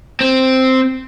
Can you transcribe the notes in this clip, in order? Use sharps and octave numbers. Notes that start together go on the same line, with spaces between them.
C4